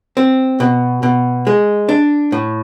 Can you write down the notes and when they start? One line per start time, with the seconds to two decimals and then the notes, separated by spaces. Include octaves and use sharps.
0.17 C4
0.60 B2
1.03 B2
1.47 G#3
1.89 D4
2.32 A2